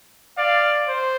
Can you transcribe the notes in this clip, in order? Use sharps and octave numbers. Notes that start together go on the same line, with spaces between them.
D5 F5
C5